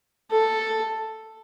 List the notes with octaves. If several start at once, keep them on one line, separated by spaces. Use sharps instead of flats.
A4